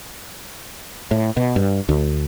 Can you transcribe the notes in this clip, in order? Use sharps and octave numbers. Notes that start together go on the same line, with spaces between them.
A2
B2
G2
D2